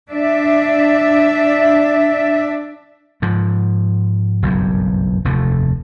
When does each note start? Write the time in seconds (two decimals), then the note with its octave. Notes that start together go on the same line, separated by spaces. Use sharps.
0.11 D4 D5 E5
3.22 G#2 F3
4.43 F#1 B1 G2
5.25 F1 D#2 A2